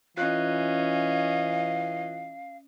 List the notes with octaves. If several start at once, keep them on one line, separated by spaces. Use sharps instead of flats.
E3 C#4 F4 D#5 F5 F#6